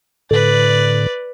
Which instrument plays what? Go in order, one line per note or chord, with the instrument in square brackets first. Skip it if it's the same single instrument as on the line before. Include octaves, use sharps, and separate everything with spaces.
[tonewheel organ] A2 D3 [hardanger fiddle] B4 D5